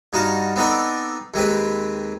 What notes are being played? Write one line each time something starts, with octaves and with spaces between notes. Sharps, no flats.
G2 D#4 F#4 F5 A5
B3 C4 D4 D#4 A4
D#2 G#3 C4 B4